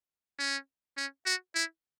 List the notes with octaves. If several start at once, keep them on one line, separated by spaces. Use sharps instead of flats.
C#4
C#4
F#4
E4